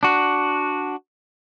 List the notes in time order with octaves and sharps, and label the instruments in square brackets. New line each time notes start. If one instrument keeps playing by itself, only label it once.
[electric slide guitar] D4 F#4